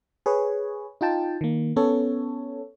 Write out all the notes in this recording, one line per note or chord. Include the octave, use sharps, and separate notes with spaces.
G#4 B4 C#5
D#4 F4 G5 A5
D#3 A#3
B3 C#4 A4 C#5